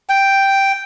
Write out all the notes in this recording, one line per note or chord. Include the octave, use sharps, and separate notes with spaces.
G5